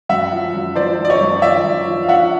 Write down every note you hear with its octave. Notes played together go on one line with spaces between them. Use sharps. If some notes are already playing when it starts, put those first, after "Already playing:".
F#2 E5 F#5
F3
F#2
F3 C5 D5
F3
D5
C#5 D#5
F#2
F3 D5 E5
F#2
F3
F5
F3 E5 F#5